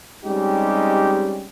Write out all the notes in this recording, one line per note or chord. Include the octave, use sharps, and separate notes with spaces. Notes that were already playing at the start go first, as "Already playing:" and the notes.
G3 G#3 C4 C#4 D#4 G4